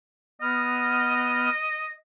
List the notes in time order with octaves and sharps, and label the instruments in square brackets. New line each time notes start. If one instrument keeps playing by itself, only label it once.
[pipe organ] B3 F6 [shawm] D#5